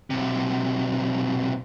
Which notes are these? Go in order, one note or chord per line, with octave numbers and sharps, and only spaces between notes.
B1 C3